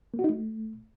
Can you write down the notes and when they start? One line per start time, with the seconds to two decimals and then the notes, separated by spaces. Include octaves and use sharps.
0.14 A#3
0.19 F#4
0.24 D#4
0.30 A3